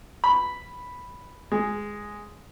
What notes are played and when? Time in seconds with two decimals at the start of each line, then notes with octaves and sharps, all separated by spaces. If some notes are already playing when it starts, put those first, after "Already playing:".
0.24 B5
1.52 G#3